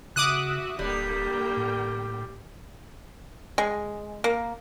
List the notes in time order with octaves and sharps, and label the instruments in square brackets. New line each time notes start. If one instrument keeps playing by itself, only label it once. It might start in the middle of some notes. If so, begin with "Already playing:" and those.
[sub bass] C#3 [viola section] F#4 E5 [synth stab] D6 D#6 F#6
[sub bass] D1 [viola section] D3 A#3 G5 [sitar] G3
[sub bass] A2
[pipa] G#3
A#3